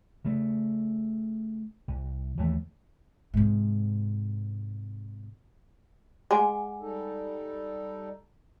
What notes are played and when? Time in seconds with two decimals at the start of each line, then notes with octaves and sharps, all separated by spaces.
0.25 C#3 A3
1.88 C2
2.37 D#2 E3 A3
3.34 G#2 C3
6.31 G#3 F#5 G#5 D6
6.81 G3 D#4 A4